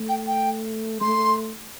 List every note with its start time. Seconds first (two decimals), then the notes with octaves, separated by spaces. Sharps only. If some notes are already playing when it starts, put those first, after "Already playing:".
Already playing: A3
0.09 G5
0.27 G5
1.01 A3 C6